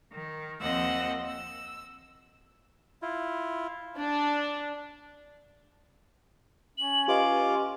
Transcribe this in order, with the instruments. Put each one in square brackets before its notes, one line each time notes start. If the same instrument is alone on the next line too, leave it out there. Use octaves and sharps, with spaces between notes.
[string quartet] D#3
D#2 F3 C4 D#5 F#5 E6
E6
[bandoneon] E4 F4
[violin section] D4
[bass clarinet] C#4 [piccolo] F#7
[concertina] F4 [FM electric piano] G4 B4 D#5 [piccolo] D6